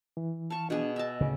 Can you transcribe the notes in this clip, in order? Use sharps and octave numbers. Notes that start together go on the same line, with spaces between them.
E3
F5 A5 C#6
B2 D4 G#4
D#5 E5 A5
D2 A2 C#3